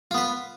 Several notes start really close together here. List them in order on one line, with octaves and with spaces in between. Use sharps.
F4 B3 B4